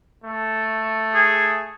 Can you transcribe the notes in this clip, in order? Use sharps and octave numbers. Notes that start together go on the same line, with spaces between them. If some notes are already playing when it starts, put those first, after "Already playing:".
A3
G#4